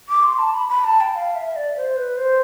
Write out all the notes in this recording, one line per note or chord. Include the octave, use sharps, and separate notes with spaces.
D6
C6
A5
B5
B5
A5
G5
F5
E5
D5
C5
B4
C5